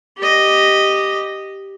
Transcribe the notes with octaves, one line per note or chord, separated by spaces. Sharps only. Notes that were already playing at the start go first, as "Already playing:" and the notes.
G4 D#5